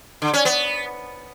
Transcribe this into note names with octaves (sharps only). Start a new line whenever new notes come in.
D3
C#4
B3